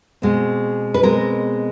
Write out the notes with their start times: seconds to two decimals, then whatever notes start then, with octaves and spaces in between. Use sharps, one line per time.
0.22 B2 G#3 C4
0.94 B4
1.03 B2 G#3 C4 A#4